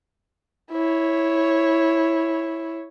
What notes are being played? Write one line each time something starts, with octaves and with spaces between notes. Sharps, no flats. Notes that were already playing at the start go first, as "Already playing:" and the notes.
E4 C#5